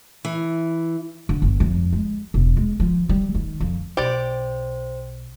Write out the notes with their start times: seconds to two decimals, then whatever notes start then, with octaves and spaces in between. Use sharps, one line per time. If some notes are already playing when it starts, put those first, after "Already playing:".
0.25 E3
1.29 D3
1.42 G1
1.60 F2
1.93 G#3
2.34 E1
2.56 G#3
2.80 F3
3.09 G3
3.35 D#3
3.60 F2
3.97 B1 G4 C5 D5